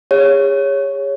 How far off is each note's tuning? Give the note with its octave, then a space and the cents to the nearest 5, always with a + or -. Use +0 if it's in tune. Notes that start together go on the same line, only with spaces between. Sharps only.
G#4 -35 C#5 +0